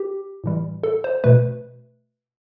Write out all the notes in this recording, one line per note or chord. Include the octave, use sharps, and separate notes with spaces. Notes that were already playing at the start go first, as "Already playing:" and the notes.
Already playing: G4
A2 E3 G3
A4
C5
B2 A3 B4